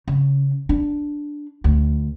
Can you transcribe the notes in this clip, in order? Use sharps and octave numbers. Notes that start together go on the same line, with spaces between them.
C#3
D4
D2